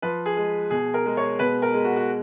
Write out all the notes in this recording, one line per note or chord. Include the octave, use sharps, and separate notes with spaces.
F3 B4
G#4
G#3
B2 G#4
A#4
G#3
C#5
B2 B4
A#4
G#3
F#4
F#4